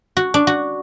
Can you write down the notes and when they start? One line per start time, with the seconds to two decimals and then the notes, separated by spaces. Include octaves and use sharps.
0.17 F#4
0.34 D4
0.47 F#4